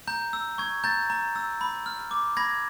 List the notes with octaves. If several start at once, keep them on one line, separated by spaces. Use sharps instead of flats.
A#5 G6
E6
C#6 G#6
A#5 G6 A6
A#5
E6
B5
F6
D6
B5 G#6 A#6